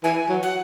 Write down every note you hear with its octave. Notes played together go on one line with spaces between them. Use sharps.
E3 G#5
F#3
F#5